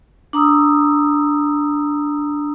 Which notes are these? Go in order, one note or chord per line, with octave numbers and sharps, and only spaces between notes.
D4 A#5 D#6 E6